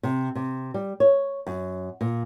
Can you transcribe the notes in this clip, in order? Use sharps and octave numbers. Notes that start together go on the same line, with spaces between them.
C3
C3
G3
C#5
F#2
A#2